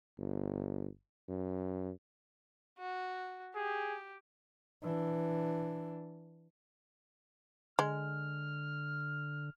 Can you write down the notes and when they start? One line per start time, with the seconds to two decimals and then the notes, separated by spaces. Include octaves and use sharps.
0.18 G1
1.29 F#2
2.78 F#4
3.55 G4 G#4
4.83 E3 D4
7.79 D3 G#3 F6